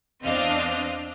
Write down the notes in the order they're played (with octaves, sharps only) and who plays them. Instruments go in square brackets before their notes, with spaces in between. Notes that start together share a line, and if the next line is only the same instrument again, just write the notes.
[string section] E2 C4 D4 D#5 F5